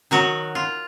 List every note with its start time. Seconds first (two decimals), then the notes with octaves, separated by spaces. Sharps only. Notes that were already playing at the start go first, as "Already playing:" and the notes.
0.11 D#3 F#3 F#4
0.55 F4